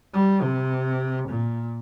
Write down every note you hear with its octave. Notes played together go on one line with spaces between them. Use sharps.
G3
C3
A#2